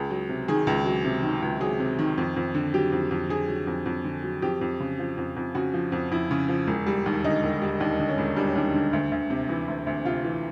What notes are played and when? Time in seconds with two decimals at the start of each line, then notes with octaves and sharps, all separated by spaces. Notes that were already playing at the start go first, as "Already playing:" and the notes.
Already playing: C#2 G#4
0.10 F#3
0.29 C3
0.48 D#3 G#4
0.67 C#2
0.86 F#3
1.05 C3
1.23 D#3
1.42 C#2
1.61 F#3 G#4
1.80 C3
1.99 D#3
2.18 F2
2.36 F2
2.54 D3
2.74 F#3 G4
2.92 F2
3.11 F2
3.29 D3 G#4
3.48 F#3
3.67 F2
3.86 F2
4.05 D3
4.24 F#3
4.42 F2 G4
4.61 F2
4.80 C#3
4.99 F3
5.17 F2
5.36 F2
5.55 C#3 F#4
5.74 F3
5.92 F2
6.11 F2 E4
6.31 C#3
6.49 F3
6.67 E1
6.86 G3
7.06 D#2
7.24 D3 D#4
7.43 E1
7.62 G3
7.80 D#2 D4
7.99 D3
8.09 C#4
8.18 E1
8.36 G3 D4
8.47 C#4
8.55 D#2 D4
8.74 D3
8.93 D2
9.12 D2
9.30 C3
9.49 E3 E4
9.68 D2
9.87 D2
10.05 C3 F4
10.24 E3